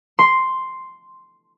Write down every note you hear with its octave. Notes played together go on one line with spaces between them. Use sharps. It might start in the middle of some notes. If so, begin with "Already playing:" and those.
C6